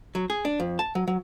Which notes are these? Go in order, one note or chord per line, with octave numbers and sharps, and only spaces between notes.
F#3
G#4
D4
F2
A5
F#3
F#3